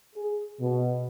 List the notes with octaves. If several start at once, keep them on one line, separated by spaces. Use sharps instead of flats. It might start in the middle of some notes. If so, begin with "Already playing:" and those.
G#4
B2